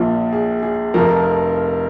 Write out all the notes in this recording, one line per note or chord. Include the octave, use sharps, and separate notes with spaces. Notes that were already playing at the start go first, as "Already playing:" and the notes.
Already playing: A#1 A#2 F3
G#4
G#4
F1 F2 F3 A#4